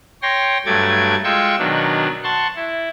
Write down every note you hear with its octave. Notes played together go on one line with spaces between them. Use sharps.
C#5 G5 C6 A#6
G2 F#3 A3 D6 G#6 A6
G#3 F4 G5 C#6 E6 G6
B2 D#3 F#3 D4
F#5 A5 C6 C#6
E4